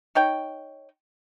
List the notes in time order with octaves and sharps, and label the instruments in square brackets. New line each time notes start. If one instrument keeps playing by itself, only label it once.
[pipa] D#4 C#5 G5